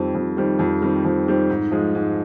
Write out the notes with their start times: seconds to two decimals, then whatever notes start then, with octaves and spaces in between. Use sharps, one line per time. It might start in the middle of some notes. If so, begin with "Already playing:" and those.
Already playing: F2 D#3 G3 C4
0.15 F2
0.37 D#3 G3 C4
0.59 F2
0.82 D#3 G3 C4
1.05 F2
1.28 D#3 G3 C4
1.50 G#2
1.71 F3 G#3
1.95 G#2